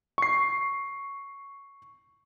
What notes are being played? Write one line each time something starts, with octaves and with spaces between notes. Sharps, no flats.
C#6 C7